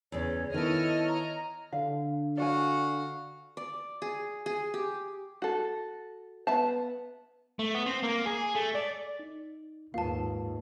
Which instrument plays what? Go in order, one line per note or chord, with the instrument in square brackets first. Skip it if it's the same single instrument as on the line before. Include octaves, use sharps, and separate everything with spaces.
[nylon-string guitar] E2 C#3 [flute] C#5
[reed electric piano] D#3 [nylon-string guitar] B3 E4 [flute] A4 [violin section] C#5 D#5 F6
[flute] A#5
[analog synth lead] D3 [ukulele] F5
[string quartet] F#4 F5 [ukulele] D5 G#5
[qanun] D5
G#4
G#4
G4
[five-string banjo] F#4 A4
B3 E5 A5
[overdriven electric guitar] A3
B3
C4
A#3
G#4
A3
D5
[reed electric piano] D#4
[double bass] D#2 G#2 [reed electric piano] A#3 F4 B4 [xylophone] F5 A5